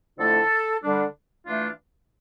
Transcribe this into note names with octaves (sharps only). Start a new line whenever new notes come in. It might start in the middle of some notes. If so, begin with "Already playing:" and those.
F2 D3 A3 E4 A4
D3 G3 D4
E3 A3 D4 F4